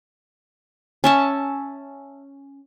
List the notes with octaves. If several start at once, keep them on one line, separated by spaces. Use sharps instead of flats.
C#4 E5 A5